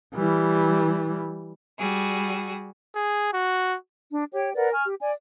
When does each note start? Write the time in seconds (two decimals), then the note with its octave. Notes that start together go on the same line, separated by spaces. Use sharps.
0.15 E3 G3
1.78 G3 F#4 G#4
2.95 G#4
3.33 F#4
4.12 D4
4.32 G4 C#5 G5
4.55 A#4 B4 D5 F#5
4.72 G#5 C#6 F6
4.86 G4
5.01 D5 G#5